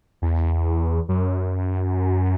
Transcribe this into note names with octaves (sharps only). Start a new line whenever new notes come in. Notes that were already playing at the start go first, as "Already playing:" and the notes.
E2
F#2